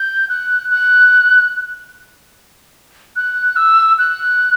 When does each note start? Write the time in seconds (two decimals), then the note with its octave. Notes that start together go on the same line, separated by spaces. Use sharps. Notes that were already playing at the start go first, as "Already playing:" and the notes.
Already playing: G6
0.29 F#6
0.71 F#6
3.16 F#6
3.56 E6
3.98 F#6